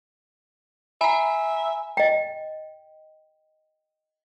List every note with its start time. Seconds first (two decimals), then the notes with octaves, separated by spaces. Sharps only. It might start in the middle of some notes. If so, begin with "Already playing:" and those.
1.01 E5 G#5 A#5 B5
1.97 D#5 G5